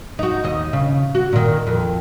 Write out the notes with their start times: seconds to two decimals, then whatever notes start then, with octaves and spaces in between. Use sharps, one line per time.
0.19 D#4 F#4
0.44 D#2 D#5
0.73 C#3
1.15 F#4
1.33 A#2 D#3
1.67 F2